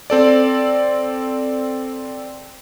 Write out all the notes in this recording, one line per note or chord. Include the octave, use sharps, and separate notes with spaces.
C4 A4 D5